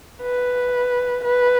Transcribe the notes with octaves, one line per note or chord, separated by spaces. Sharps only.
B4
B4